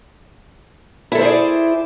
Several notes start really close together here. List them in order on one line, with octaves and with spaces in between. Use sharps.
E4 A4 C5 G#4 D5